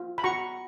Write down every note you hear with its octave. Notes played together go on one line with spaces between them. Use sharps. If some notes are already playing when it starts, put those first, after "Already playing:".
Already playing: F4
B5
F#4 A#5 C#6